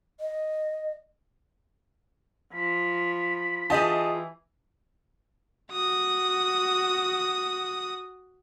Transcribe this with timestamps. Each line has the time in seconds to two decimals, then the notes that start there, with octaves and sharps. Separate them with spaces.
0.20 D#5
2.54 F3 B5
3.70 E3 F4 G4 G#4 D#5 A5
5.72 F#4 D#6